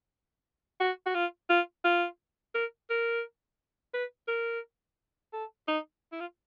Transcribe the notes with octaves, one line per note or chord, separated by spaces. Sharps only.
F#4
F#4
F4
F4
F4
A#4
A#4
B4
A#4
A4
D#4
E4
F4